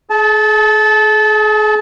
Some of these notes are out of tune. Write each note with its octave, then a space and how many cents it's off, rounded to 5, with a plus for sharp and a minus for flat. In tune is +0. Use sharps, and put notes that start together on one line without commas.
G#4 +40 A5 -20